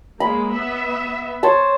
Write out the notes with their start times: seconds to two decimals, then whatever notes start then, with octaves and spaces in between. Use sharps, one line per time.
0.20 G#3 A#3 B5
0.53 B3 E5
1.43 C5 C#5 A5